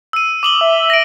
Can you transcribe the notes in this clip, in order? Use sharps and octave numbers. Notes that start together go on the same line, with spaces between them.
E6 D#7
D6 D#6 F#7 G7
E5
A#6 D7